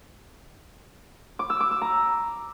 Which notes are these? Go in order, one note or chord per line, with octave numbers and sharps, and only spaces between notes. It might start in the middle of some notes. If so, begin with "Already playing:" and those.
D6
E6
D6
E6
A#5